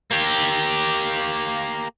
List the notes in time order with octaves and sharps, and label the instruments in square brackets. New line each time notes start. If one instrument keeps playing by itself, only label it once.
[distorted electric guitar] A#3 G4